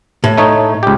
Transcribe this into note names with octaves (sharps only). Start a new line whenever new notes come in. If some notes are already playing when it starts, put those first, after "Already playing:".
A2
A3 D#4 C#5
C#2 G4